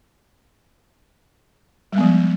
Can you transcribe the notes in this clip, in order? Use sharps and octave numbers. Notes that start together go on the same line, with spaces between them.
F3 G3 G#3 B3